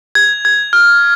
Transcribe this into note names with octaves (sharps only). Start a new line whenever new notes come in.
G#6
G#6
F6